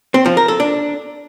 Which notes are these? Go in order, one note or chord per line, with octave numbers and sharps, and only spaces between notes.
C4
F3
A#4
A4
D4